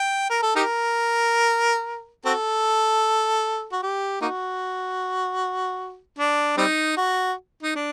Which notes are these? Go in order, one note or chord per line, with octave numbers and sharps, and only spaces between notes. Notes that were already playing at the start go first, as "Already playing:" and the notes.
Already playing: G5
A#4
A4
D#4 G4 A#4
C4 F#4 A4
F#4
G4
A#3 D#4 F#4
D4
G3 C4 D#4
F#4
D#4
D4